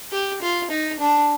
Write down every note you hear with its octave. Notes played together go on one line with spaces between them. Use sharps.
G4
F4
D#4
D4